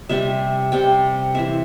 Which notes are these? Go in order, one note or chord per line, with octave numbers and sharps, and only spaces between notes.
C3 G3 C4 E5
C3 G3 C4 G5
E3 C4 E5